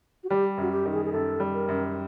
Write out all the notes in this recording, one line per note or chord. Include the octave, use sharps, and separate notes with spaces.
F#4
G3 G4
F#2 F#4
G4
D#3
G#4
G#4
F#2 A4
G3
A#4
F#2